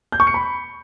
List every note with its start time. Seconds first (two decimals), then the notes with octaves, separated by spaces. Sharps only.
0.12 G6
0.20 C#6
0.27 C#7
0.34 B5